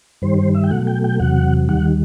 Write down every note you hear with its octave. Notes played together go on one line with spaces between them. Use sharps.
G2 D#3 G3 C5
C5
E5
G5
B2 F#3 A3 F#5
G5
G5
E2 C3 F#3 F#5
D#2 D#3 G3 F#5